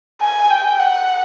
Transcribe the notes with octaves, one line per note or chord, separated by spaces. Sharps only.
G#5
G5
F#5